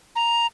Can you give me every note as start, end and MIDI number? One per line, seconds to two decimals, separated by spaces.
0.16 0.47 82